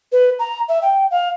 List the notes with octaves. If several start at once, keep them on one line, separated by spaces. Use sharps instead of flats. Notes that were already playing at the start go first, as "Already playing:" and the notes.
B4
A#5
E5
G5
F5